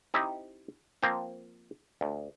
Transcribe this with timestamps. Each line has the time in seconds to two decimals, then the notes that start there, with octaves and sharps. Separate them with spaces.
0.14 C4 D#4 E4 G4
1.02 F3 A#3 C4 C5
2.01 D2